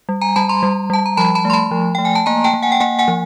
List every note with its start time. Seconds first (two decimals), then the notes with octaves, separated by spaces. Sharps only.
0.09 G3
0.21 G#5 A#5
0.36 G3 A5 B5
0.49 A#5 C6
0.63 G3
0.90 G3 A5
1.06 A#5
1.17 F3 A5 B5
1.35 A5 B5
1.45 A3 C6
1.53 A5 B5
1.71 F3
1.95 A3 G5
2.05 G#5
2.15 A5
2.26 A#3 G#5 A#5
2.44 G5 A5
2.54 A#3
2.63 F#5 G#5
2.72 G5
2.80 A#3 F#5 G#5
2.99 F#5 G#5
3.08 F3